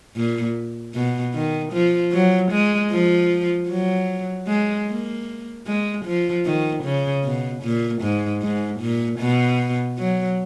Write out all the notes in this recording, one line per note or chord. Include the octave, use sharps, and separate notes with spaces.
A#2
B2
D#3
F3
F#3
G#3
F3
F#3
G#3
A#3
G#3
F3
D#3
C#3
B2
A#2
G#2
G#2
A#2
B2
F#3